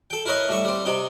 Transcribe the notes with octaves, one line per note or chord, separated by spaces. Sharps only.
A4 G5
E4 A#4 B4 C#5 D#5
A2 G3 E5 C#6
G3 C4
C3 D#4 G5